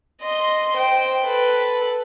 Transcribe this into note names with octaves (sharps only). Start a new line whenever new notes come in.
D#5 C6
C5 G5
A4 B4